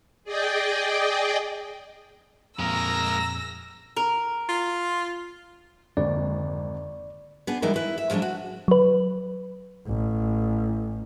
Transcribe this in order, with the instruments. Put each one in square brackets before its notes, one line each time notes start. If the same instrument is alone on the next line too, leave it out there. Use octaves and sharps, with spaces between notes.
[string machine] G#4 D5 D#5 G5
[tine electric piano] F2 A#2 [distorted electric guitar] G#3 A#4 [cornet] A#5 [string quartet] E6 A#6
[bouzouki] A#4
[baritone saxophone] F4
[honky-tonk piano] G#1 [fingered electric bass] F2 D3 A#3 [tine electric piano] D5
[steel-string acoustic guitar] B3 D4 G#4
E3 G3 G#3 D#4 E4 A#4
E4 B4
E5
F3 F#3 G#3 A3 D4
F#4
[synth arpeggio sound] F#3 B4
[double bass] A1